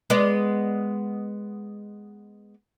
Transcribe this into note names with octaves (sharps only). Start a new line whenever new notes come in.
G#3 B3 D5